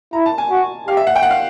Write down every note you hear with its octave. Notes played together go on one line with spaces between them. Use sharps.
E4 A#5
A5
G#5
F#4
G4 F5
E5
F#5
G5
F#5
F5